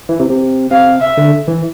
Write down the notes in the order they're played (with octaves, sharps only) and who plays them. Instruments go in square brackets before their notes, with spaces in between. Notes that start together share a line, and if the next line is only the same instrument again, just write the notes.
[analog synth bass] E3
C3
C3
[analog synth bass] C3 [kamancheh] F5
[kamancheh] E5
[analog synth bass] D3
E3